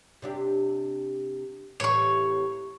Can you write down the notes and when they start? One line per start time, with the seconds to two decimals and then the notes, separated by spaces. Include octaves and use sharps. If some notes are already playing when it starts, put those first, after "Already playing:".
0.22 C3 D4 G4
1.80 A2 C3 E3 C#5 C#6